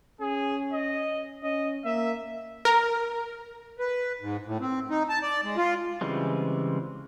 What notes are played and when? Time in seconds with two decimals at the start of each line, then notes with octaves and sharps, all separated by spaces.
0.21 C#4 G#4
0.73 D#5
1.43 C#4 D#5
1.85 A#3 E5
2.65 A#4
3.79 B4
4.21 G#2
4.46 A2
4.60 C4
4.90 D#4
5.09 A5
5.22 D5
5.44 G#3
5.57 F4
6.01 C#3 E3 G3 G#3 C4